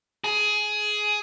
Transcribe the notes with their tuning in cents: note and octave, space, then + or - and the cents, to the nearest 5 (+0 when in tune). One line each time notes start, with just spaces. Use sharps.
G#4 +15